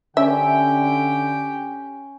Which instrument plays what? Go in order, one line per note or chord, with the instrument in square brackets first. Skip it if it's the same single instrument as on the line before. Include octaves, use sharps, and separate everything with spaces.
[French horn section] D3 [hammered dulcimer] C#4 [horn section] G4 G5 [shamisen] E5